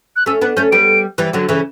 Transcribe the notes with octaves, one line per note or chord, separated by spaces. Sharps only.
F#6
A3 C#4 E6
B3 D4 F#6
A3 C#4 G6
G3 B3 D7
E3 G3
D3 F#3
C#3 E3